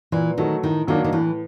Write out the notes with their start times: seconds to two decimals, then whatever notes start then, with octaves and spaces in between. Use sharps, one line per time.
0.12 A#2 E3
0.38 D#3 F#3 A3
0.63 A2 D#3
0.87 D#3 F#3 A#3 D4
1.04 D#3
1.13 A2 E3